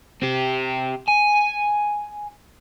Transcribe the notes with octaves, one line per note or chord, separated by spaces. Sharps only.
C4 G4
G#5